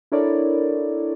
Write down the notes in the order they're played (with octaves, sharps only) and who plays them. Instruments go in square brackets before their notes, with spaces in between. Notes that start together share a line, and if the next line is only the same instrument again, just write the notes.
[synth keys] D4 E4 A4 A#4 C#5 D5